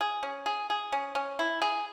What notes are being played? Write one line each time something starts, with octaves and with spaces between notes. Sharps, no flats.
G#4
C#4
G#4
G#4
C#4
C#4
E4
G#4